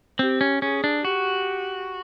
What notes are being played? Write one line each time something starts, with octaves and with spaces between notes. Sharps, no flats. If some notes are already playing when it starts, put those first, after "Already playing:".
C4 G4
C#4
C#4 G#4
D4
F#4 G4